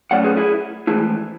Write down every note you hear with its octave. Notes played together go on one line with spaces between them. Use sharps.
A2 F#3 A3 C#4 D5 F#5
G#4 B4
E4 G#4
G#2 E3 A3 E4 G#4